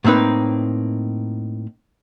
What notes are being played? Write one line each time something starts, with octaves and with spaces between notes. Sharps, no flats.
A2 A#3 C4 D#4 B4